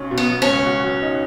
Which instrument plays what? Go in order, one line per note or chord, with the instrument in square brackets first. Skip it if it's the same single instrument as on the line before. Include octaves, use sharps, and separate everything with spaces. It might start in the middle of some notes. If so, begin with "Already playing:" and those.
Already playing: [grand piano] B1 C#4
B2
[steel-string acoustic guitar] B3
[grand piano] F#3
[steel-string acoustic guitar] C#4
[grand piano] C#2
F#4
F#3
D#4